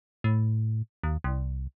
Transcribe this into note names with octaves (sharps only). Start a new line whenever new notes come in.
A2
D#2
C2